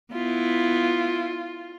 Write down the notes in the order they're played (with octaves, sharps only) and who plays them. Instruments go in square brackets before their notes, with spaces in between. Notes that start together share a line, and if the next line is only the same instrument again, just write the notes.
[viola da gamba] B3 E4 [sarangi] F4